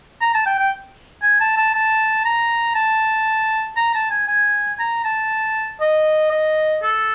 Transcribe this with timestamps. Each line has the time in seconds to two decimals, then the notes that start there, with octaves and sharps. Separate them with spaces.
0.21 A#5
0.34 A5
0.46 G5
0.59 G5
1.22 G#5
1.40 A5
1.57 A5
1.74 A5
2.25 A#5
2.75 A5
3.77 A#5
3.95 A5
4.10 G#5
4.28 G#5
4.79 A#5
5.05 A5
5.81 D#5
6.31 D#5
6.83 A4